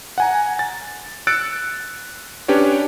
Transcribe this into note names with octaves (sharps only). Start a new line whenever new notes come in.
F#5 G#5 A#5
A6
E6 F#6 A6 C#7 D7
C#4 D4 G4 B4 C#5